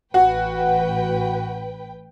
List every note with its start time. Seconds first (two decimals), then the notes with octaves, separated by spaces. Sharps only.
0.14 A1 F#4 B4 F#5 G5